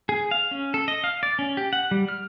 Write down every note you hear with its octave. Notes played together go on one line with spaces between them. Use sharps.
G#4
F5
C#4
A4
D#5
F5
D5
C#4
G4
F#5
G3
F6